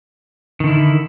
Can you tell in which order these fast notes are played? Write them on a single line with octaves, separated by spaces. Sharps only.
D#3 D3 E4